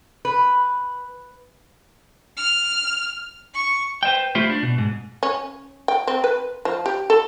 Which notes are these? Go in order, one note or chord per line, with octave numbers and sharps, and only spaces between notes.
B4
F6
C#6
B4 C5 D#5 G5
A3 E4 F4 G4 C5
D4
B2
G#2
C#4
G5
C4
B4
F3
G4
A4